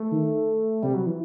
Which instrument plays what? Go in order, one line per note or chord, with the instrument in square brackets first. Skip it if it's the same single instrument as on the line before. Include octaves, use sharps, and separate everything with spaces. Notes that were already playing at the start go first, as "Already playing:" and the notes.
Already playing: [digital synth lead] A3
[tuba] D#3
[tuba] C3 [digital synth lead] G3
[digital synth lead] F#3
E3